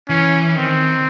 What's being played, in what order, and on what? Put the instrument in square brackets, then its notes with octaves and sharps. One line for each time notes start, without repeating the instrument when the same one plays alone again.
[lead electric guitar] E3 [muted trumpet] C#4
[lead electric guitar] D#3 [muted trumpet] C4